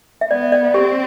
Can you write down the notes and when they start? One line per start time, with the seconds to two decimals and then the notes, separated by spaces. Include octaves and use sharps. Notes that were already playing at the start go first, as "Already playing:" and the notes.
0.21 E5
0.31 B3 D5
0.52 D5
0.74 C4 G4